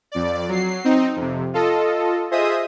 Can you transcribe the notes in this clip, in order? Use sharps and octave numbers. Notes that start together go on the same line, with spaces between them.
F2 D5
F#3 C7
C4 D#4
F2 C3
F4 A4 D#5
F4 G#4 C5 D#5 E5 D#6